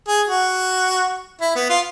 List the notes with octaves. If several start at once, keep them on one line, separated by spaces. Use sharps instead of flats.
G#4
F#4
E4
B3
F4